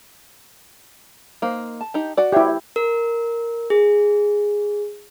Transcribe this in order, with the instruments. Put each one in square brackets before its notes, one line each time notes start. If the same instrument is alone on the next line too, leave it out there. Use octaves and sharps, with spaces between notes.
[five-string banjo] A#3 [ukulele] D#4 C5
[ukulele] A5
[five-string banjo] D#4 G4
F#4 D5
[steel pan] E4 G4 [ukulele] C5 C#5 E5
[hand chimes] A#4
G#4